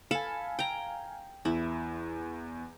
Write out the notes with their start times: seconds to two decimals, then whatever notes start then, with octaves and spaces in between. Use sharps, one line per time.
0.11 A4 F5 G#5 A5 B5
0.59 G5 A#5
1.45 E2 E4